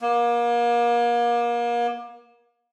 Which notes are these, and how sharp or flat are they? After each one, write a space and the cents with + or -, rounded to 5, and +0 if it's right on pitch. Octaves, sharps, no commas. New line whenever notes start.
A#3 +35